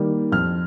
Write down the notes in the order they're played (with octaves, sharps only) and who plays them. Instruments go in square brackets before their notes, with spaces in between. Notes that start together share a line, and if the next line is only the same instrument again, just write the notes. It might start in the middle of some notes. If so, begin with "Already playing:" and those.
Already playing: [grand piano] D#3 G3 A#3
F2 F6